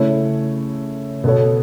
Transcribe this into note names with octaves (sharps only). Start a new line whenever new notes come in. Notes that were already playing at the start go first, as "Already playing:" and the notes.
Already playing: C#3 A3 E4 C#5
B2 B3 A4 C#5